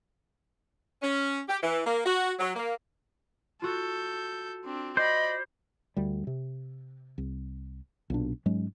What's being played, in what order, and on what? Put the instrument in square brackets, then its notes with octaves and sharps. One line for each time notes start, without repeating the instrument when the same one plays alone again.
[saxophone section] C#4
G4
E3
A#3
F#4
F#3
A#3
[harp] F4 F#4 [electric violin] A4 G6
[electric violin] C4 D4
[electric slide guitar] C5 [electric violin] D5 B5 [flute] D#5
[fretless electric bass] D2 G3
C3
C2
B1 A#2 D4
G#2 F#3 G#3 C#4